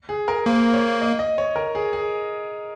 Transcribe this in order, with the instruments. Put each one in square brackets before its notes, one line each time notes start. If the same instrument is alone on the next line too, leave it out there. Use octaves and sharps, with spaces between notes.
[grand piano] G#4
A#4
[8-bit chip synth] A#3 [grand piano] C5
[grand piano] C#5
D#5
D#5
C#5
A#4
G#4
G#4